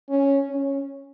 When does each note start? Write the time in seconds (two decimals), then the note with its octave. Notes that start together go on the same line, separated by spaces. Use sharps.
0.09 C#4
0.50 C#4